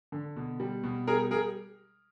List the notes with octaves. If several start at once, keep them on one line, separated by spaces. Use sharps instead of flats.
D3
B2
G3
B2
G3 G#4 A#4
G3 G#4 A#4